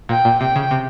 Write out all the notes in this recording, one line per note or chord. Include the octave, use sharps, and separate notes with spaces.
A#2 G5
A#2
C3 G5
C#3
C3